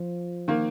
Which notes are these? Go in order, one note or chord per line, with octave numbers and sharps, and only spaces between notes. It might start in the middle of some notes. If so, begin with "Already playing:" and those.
Already playing: F3
D#3 A#3